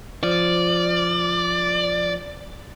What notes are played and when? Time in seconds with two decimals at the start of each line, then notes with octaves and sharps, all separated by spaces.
0.23 F3 D5